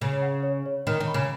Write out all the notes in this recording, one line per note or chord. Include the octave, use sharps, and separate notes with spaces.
C#3 C#5
F#5
C#5
C#5
D#3 C#5
D#3
B5
C#3